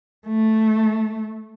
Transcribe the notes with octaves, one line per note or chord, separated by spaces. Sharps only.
A3